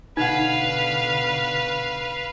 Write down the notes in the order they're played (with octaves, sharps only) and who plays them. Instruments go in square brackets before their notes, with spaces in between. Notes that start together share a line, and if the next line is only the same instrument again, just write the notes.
[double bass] B2 D3 [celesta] D#4 F#5 [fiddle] B4 F5